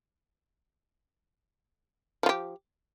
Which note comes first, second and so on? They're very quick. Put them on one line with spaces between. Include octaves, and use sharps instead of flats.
F3 F4 G4